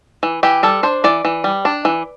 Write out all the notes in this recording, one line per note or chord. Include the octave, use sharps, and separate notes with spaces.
E3
E3 G4
G3 A4
D4 C5
E3 D5
E3
G3
D4
E3